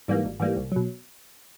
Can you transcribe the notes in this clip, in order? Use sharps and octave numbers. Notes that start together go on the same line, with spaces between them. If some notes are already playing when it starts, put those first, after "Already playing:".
G#2 E3 G3 A#3
G#1
G#2 E3 G3 A#3
C2
B2 F#3